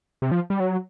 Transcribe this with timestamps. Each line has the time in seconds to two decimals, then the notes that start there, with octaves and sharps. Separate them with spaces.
0.22 C3
0.31 F3
0.50 G3
0.60 F#3